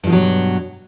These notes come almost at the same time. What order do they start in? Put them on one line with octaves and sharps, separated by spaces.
G2 F3 B2 F#3